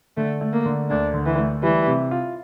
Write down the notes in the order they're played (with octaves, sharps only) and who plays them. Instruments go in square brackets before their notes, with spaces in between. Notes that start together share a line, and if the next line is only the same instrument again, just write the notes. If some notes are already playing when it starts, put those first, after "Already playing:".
[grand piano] D3 [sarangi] A3
[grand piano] A3
[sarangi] A#3
[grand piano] D3
[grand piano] D2 [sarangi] D4
[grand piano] D3
[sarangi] E3
[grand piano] A3
[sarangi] E3 [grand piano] G3
[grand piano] C3
F4